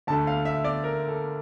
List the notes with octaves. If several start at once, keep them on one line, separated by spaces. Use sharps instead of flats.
D2 D3 A3 A5
F5
E5
D5
A#4
A4